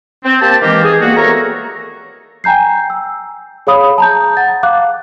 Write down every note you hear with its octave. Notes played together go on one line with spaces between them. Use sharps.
C4
A#3 G4 C5 G5 A5
D#3 E3 G#3 A#3 C4 G4
G#4
G3 A#3 B3 F#4
E3 A4 A#4 C#5 A#5
G5 G#5 A#5 G6 C7
E6
G#4 C#5 F5 B5 D#6
A5 A#5 G6
F#5 A6
F5 D6 F#6